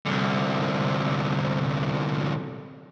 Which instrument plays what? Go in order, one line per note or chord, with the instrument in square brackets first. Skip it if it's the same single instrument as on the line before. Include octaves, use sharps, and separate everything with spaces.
[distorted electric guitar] C2 D3